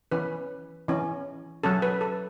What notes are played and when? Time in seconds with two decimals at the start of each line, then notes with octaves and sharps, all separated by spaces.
0.12 E3 C#4 B4
0.88 E3 C#4
1.63 F#3 C#4 A4
1.82 B4
2.01 A4